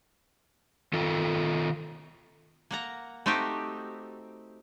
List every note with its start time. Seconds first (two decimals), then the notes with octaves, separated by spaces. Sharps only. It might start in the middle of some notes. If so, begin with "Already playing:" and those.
0.93 D#3 F4 A4
2.71 A#3 F#5 A#5
3.26 A3 C4 D#4 F#4 G4